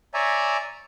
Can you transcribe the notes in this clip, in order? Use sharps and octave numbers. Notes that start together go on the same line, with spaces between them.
C#5 D5 E5 G#5 A#5